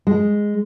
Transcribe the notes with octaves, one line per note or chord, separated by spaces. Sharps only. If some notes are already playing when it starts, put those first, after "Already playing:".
G#3